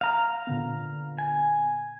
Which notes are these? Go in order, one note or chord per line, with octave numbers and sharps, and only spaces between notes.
F5 A#5
A#2 D3 B3
G#5